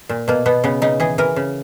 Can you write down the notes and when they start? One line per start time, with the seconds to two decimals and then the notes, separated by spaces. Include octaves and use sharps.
0.09 A#2
0.28 B2 A#3
0.46 B2 B3
0.64 C#3 B3
0.82 C#3 D#4
1.00 E3 G#4
1.18 E3 A#4
1.36 C#3